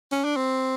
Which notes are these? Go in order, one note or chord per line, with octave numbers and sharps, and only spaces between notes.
C#4
D4
C4